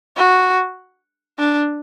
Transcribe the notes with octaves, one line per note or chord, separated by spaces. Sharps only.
F#4
D4